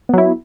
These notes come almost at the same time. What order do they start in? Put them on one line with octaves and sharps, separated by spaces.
B3 F#3 E4